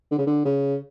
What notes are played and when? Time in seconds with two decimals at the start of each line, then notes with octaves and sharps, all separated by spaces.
0.11 D3
0.18 C#3
0.27 D3
0.45 C#3